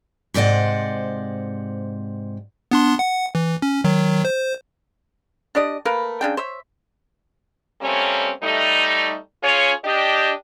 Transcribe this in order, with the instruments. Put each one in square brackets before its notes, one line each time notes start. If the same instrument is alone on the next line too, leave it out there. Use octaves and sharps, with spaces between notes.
[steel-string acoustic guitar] G#2 C3 C5 D5 D#5 F#5
[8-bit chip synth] B3 D4 C6
F#5
E3
C#4
D#3 F#3
C5
[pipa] D4 G4 D5 D#5
A3 A#3 A#4 B4
C#3 D4 G5
C5 C#5 E5
[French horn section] G3 A3 A#3 C4 C#4
G3 A3 D#4
C#4 F4 G#4 C#5
D4 G4 D#5